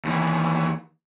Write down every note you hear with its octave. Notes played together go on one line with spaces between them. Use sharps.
D#2 E3